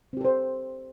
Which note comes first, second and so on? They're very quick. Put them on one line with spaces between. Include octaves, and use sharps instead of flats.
C4 G4 A4 C5